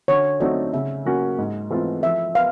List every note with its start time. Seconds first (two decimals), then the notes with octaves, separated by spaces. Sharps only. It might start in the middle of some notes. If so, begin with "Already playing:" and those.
0.08 D3 C#5
0.40 F#3 A3 C4 D#4 D5
0.73 C#3 E5
1.05 F#3 A#3 C#4 F#4
1.38 G#2
1.70 E3 A3 C4 F4
2.03 F3 E5
2.35 B3 F5